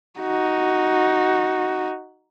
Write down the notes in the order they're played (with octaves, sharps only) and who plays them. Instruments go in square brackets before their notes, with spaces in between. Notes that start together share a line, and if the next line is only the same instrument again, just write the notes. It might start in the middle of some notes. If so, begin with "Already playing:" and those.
[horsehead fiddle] D#4 F#4